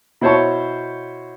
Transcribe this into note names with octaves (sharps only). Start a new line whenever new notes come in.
B2 E4 C5 C#5 A5 C#6